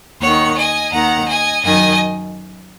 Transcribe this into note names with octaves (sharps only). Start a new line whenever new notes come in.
D#2 D#3 C#5 F#5
D#5 G#5
D#2 D#3 F#5 A#5
D#5 G#5
F#2 D#3 D#5 G#5